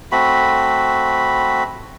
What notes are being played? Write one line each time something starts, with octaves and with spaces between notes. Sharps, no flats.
A3 C4 F#4 B5